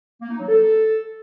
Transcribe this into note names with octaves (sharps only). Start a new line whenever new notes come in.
A#3
D#4
F#3
A4